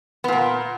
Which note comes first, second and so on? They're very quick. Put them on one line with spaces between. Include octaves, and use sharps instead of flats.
B3 A#2 A#3